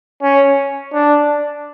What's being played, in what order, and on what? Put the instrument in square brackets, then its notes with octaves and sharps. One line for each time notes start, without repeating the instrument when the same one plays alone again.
[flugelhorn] C#4
D4